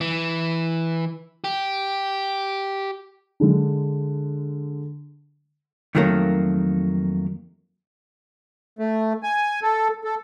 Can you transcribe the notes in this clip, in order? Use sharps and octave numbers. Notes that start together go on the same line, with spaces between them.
E3
G4
D3 G#3 D4
F2 D#3 F#3 A3 A#3
A3
G#5
A4
A4